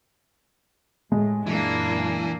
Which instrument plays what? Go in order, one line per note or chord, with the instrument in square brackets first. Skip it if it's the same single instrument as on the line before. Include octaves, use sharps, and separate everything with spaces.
[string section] A2 [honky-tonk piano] G#3
[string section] F#2 A#2 [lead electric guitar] E3 [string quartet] A#3 D4